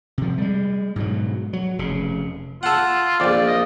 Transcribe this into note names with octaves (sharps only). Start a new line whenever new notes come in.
C3 F3
G3 G#3
G#2 B2 F#3
F#3
F1 C#3
F4 A4 F#5
A#1 F2 D5
D#5